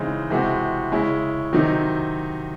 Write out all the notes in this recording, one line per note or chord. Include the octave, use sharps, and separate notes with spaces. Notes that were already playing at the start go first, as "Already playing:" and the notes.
Already playing: C#3 E3 G#3 C4 D#4
C3 E3 G#3 C4 F#4
C#3 G#3 C#4 E4
C3 D#3 F#3 C4 D#4